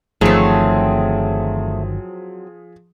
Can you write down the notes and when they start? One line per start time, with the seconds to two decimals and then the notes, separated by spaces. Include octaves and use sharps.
0.21 G1 D#3 F3 F#3 A3 C4 G#4